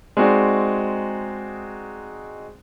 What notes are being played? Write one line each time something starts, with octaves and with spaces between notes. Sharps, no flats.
G#3 C4 D#4 F#4 G#4 D5